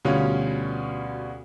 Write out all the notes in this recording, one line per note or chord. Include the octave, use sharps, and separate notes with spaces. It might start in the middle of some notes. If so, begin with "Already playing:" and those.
D2 B2 G3 C#4 F4